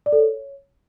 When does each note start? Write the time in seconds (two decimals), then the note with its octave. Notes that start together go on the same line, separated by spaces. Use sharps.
0.06 D5
0.12 A4
0.19 C#5